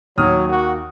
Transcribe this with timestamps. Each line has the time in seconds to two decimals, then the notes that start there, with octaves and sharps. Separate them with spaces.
0.18 D#2 F#3 D#6 F6
0.50 A#3 F#4